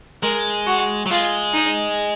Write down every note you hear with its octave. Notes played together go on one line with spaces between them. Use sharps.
G#3 A#4
F#4
F#3
G#3 F4
D#4